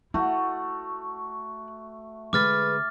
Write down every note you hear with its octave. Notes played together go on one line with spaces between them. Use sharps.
A3 E4 F#4
D3 G#3 B4 D6 F6 A6